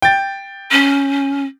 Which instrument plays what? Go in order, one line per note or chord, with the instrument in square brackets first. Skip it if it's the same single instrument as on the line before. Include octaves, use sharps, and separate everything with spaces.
[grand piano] G5 A6
[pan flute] C#4